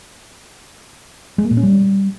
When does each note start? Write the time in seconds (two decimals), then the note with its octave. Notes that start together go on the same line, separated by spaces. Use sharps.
1.38 G#3
1.45 A#3
1.51 A#2
1.57 C#4
1.63 G3